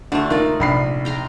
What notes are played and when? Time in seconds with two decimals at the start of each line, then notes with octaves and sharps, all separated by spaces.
0.12 D2 A3 D4
0.30 D3 A#3 D#4 F4 D5
0.60 A#1 C3 B5 C7
1.05 G5 A#5 C6